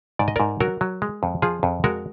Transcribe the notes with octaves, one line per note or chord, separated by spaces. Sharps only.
G#2 D5
D#5
G#2 A#4 D5
F#3 F#4 A#4
F#3
G#3
F2
F3 F4 G#4
F2
G#3 F#4 A#4